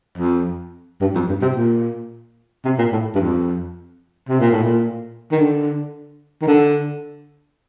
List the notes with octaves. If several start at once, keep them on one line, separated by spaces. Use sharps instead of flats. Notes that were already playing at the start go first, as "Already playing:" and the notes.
F2
G2
F2
G2
C3
A#2
C3
A#2
A2
G2
F2
C3
A#2
A2
A#2
D#3
D3
D#3
D3